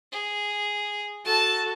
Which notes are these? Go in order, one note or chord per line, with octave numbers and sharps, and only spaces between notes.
G#4
F#4 A4 A5